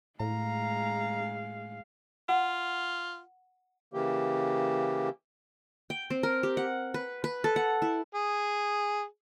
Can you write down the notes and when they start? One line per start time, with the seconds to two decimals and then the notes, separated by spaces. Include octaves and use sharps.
0.20 A2 G#3 F5 A#5
2.29 F4 F#5
3.93 C#3 E3 A#3 G4
5.90 G5
6.10 C4
6.23 A#4
6.43 G4
6.57 F#5
6.94 B4
7.24 B4
7.44 A4
7.56 F#5
7.82 E4
8.15 G#4